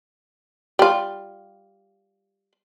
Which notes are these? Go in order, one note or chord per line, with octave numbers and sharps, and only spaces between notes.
G3 F4